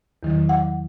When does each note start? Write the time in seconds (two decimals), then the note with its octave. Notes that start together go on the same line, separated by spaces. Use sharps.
0.23 E2 D#3 F#3
0.49 F#5